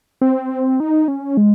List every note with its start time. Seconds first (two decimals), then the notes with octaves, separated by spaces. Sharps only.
0.21 C4
0.80 D#4
1.08 C#4
1.37 G#3